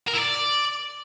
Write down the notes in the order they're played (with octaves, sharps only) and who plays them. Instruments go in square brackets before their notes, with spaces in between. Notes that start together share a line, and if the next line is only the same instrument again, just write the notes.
[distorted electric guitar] A#4
E4
D5